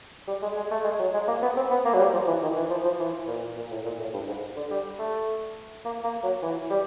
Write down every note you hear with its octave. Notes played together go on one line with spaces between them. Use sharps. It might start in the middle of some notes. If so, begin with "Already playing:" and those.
G3
G#3
G#3
A3
G#3
F#3
G#3
A#3
B3
C4
B3
A#3
F#3
G3
F3
E3
D#3
E3
F3
F3
E3
A#2
A#2
A2
A#2
A2
G2
G#2
D3
G3
A3
A#3
A#3
F#3
E3
G3